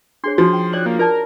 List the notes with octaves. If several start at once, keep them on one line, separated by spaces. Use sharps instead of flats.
D4 G#4 C#5 C6
F3 D4 D#4 F#4
G5
C#5 D5 D6 F#6
A#3
F4 A#4 D5 A5